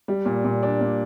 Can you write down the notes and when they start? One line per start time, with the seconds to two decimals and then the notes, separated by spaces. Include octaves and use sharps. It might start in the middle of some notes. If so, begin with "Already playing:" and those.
0.08 G3
0.25 A#2
0.45 A#2
0.63 D4
0.81 A#2